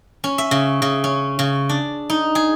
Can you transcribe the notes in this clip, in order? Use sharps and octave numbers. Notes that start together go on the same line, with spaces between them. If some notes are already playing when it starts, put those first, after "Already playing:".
C#4
E5
C#3
C#3
C#4
C#3
D4
D#4
G#4